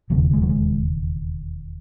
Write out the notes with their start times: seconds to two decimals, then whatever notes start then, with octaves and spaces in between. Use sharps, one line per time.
0.10 E1 D#2 C#3 F#3
0.33 G#3
0.42 F#3
0.49 G#3